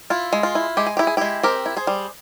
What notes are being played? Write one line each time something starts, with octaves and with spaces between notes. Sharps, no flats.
E4 F4
G#3
F4
E4
G#3 G4
G#4
E4 G4
G#4
G#3 E4 G4
C4 G4 A#4
E4
G#4 C5
G3